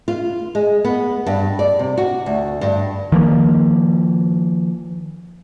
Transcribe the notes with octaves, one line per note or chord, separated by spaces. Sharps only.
F4
G#3
B3
G2
D5
C3
F#4
D2
G2
D#3 F3 A#3